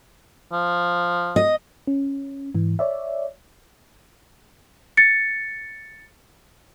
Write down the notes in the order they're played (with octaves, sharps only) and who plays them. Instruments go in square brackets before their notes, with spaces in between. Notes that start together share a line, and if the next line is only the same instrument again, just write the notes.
[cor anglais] F3
[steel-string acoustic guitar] D#5
[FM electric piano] C#4
G#2 E3
C#5 D5 E5
[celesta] A6 C#7